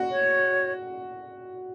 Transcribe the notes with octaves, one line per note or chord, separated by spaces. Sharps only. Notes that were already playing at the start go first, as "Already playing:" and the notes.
Already playing: F#4
C#5